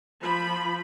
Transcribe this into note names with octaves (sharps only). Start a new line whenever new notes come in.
F3 B5